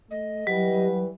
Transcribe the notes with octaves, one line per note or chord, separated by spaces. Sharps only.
A3 D#5
E3 F#3 G3 G4 B4